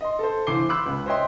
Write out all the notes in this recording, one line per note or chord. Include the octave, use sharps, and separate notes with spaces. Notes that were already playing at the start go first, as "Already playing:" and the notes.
D#5 C6
A4 C5
G1 E3 C5 D6 C7 G7
B5 C6 D6 E6 F#6
C#2
C5 C#5 D#5 E5 G5 C6